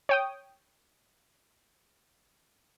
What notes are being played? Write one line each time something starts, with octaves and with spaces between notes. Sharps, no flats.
C#5 G5 D#6